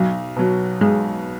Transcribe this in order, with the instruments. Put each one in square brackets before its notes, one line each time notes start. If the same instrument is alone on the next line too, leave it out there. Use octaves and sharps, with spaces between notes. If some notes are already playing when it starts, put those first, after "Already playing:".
Already playing: [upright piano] B1 [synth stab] F#3
[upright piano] B2 F#3
[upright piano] B1 [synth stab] G#3